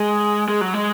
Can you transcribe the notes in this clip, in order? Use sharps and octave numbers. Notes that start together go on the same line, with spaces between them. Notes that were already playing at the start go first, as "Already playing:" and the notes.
Already playing: G#3
G#3
F#3
G#3